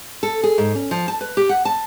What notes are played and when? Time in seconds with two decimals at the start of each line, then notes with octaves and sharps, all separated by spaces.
0.23 A4
0.44 G#4
0.58 G#2
0.75 C#4
0.91 F3
1.08 A5
1.21 B4
1.37 G4
1.49 F#5
1.65 A5